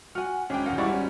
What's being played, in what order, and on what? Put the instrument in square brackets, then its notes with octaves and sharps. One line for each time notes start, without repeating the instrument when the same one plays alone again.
[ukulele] F#4 G#5 [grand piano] F#5 F6
[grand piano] G#1 [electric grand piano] C#4 G5 [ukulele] D4 G#4
[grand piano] E1 D#3 F5 [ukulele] A#4 F#5
[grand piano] G#1 G3 G#3 [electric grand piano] E4 D5 C#6 [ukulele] F#5
[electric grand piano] C#4